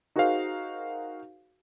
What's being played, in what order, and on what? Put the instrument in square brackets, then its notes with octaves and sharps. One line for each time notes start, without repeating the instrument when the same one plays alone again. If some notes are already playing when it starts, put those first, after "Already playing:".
[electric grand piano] D#4 F#4 G#4 A#4 C5 F5